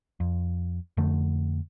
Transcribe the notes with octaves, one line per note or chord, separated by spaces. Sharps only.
F2
F2 D3 A3